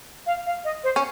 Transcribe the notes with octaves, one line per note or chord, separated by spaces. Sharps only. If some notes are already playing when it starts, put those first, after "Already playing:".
F5
F5
D#5
C5
C#4